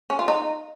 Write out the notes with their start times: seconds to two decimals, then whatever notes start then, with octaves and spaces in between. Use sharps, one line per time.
0.10 C#4
0.19 F4
0.28 D#4